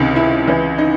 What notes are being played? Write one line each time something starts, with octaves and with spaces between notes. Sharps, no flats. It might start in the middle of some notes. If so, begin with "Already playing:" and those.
Already playing: C#2 C3 D#3
E4
C#2 C#3 E3
D#4